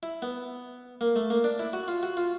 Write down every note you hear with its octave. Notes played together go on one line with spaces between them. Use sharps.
E4
B3
A#3
A3
A#3
D4
E4
F#4
F4
F#4
F4